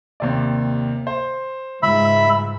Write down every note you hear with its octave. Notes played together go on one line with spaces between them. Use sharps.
D#2 C3 D5
C5
C#2 G#2 E5 B5